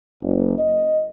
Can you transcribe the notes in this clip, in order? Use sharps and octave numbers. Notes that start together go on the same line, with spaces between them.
F#1
D#5